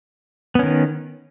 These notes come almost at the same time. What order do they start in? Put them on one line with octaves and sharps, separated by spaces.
B3 C#4 D#3